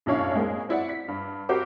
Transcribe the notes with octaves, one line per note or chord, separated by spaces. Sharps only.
B1 F#2 A2 D4 C#5 F5
G#3 A#3 C4 G#4
C4 E4 D5 F#5
B6
G2
C4 F#4 G4 A#4 C5 D6